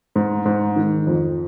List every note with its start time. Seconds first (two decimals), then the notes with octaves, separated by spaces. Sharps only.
0.16 G#2
0.45 G#2
0.76 D#3
1.07 F2